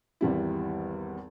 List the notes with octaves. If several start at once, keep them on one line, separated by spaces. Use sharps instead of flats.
G#1 E2 G3 E4